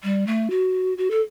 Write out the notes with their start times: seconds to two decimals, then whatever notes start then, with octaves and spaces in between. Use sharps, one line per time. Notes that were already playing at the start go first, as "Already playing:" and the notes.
0.03 G3
0.26 A3
0.50 F#4
0.97 F#4
1.10 A4